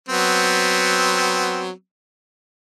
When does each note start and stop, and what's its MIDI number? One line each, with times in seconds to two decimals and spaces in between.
0.09 1.71 54
0.09 1.71 59
0.09 1.71 60